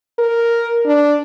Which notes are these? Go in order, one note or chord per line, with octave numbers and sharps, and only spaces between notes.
A#4
D4